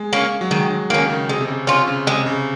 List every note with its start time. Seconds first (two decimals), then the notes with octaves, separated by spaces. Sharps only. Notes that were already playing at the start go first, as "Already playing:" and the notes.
Already playing: G#3
0.13 A#3 C#4
0.41 F#3
0.51 D#3 G#3
0.70 F#3
0.90 D#3 A#3 C#4
1.10 C#3
1.29 C3 G#3
1.41 C3
1.48 C#3
1.67 C3 C#4 F4
1.87 C#3
2.07 C3 G#3
2.26 C#3